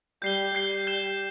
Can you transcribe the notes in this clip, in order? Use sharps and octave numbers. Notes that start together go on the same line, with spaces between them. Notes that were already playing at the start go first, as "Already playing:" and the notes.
G3 G6 C7 G7
G3 G6 C7 G7
G6 E7 G7